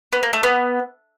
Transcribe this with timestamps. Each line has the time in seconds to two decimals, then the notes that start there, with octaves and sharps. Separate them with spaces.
0.13 B3
0.23 A#3
0.33 A3
0.43 B3